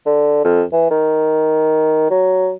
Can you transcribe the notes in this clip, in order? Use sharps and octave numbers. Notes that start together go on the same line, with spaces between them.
D3
F2
E3
D#3
F#3